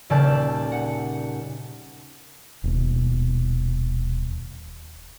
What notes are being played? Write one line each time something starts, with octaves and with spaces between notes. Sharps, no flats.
D#1 C#3 A4 D5 A5 G6
F#5
D#1 B2